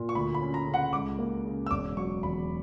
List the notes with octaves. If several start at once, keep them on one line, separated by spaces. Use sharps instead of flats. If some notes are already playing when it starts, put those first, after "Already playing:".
Already playing: A#2
C#6
D2 B5
B5
C#4
A#5
C#3
F#5
C#2 D6
A#3
C#3
E6
E1 D6
F#3 C#6
E2 B5